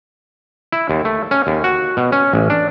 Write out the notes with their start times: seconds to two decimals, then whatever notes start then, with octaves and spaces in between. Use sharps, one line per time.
0.72 E4
0.89 D#2
1.05 A3
1.31 C#4
1.47 D#2
1.64 F#4
1.97 B2
2.12 C#4
2.33 A1
2.50 D4